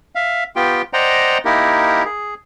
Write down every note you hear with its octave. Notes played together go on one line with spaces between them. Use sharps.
E5 F5
B3 F4 G4 G5
C5 D5 D#5 F#5 G5 A#5
A#3 D#4 E4 G4 A#4
G#4